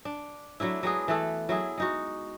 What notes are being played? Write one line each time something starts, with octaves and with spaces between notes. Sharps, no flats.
D4
F#3 A3 D4 E4
F#3 G#3 B3 G#4
E3 A3 A4
F#3 E4 G#4
G#3 D#4 F#4